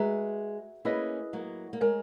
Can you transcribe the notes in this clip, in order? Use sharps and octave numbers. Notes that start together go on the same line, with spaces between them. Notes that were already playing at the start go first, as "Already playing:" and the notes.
Already playing: G#3 F#4 B4 E5 A#5
A#3 C#4 E4 G#4 B4 D#5
F#3 A#3
A#3
G#3 A#4 C#5 G#5